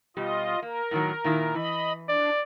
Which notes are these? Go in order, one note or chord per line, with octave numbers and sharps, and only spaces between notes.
B2 G3 F4 G4 D#5
A#3 A#4
A2 D#3 F#3
A#2 D#3 E4
E3 D#5 B5
D4 D5